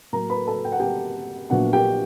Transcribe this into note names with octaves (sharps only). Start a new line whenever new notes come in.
A2 F#3 A#3 A#4 A#5
B4 B5
A4 A5
G5
F#5
G4 G5
A#1 A#2 F#3 B3 D4 F#4 F#5
G4 G5